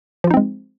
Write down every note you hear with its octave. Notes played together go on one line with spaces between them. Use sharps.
F3 G#3 C4 D#4 F4